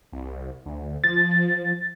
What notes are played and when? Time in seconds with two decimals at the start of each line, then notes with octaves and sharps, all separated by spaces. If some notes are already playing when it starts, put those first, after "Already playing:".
0.12 C2
0.66 D2
1.04 F3 A6